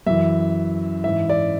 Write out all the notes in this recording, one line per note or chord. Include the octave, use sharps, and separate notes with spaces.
F#2 E3 E5
G#2 E3 E5
D5